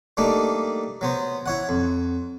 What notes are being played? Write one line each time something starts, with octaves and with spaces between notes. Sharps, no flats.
G3 A3 A#3 D4 D#4
F#3 B3 C5
E4 C#5 F#5
F2